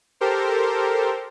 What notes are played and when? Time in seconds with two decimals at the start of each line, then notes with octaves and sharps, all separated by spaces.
0.21 G4 A4 A#4 C5